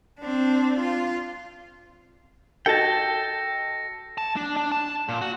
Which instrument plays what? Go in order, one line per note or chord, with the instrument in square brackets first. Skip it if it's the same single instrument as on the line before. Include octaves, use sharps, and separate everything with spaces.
[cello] C4 D4
F4
[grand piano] F#4 A4 D#5 [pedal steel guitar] G5 A5 [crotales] A#6 C#7
[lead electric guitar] A5
D4
D4
A5
A#2
F#4